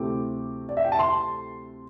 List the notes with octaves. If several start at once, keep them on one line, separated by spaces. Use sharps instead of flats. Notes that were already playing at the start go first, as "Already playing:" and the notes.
Already playing: D2 C3 A3 C4 E4 D6
D5
E5
G5
A5
C6